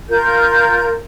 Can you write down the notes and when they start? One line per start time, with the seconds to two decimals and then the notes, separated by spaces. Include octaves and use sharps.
0.10 F4 A#4 G6